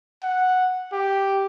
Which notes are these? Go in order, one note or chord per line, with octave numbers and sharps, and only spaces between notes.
F#5
G4